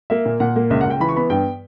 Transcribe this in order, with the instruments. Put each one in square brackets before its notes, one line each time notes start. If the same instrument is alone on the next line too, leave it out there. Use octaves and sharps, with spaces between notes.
[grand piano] A#3 E5
A#2
A#2 F#5
A#3
C#2 E5
F#5
C#2
G5
E3 B5
C#6
B3 B5
G2 G5